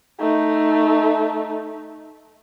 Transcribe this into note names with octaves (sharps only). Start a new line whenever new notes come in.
A3 D#4